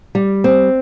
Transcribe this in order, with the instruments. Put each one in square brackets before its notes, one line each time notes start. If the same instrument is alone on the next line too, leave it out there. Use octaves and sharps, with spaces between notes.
[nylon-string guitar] G3
C4